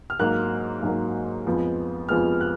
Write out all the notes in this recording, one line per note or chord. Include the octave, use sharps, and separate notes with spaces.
F6
G#2 F#3 A#3 F#6
G#2 F#3 A#3
F2 F3 G#3 B3
F2 F3 G#3 B3 F6
F#6